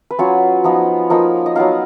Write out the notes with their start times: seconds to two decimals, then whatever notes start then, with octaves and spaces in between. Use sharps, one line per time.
0.11 B4
0.19 F#3 C#4 F4 C#5
0.64 F3 B3 D#4
1.10 F3 A#3 D#4
1.46 D#5
1.55 F#3 B3 D#4 F5